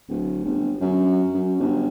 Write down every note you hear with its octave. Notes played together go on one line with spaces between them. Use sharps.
D1
G1
F#2
F#2
G1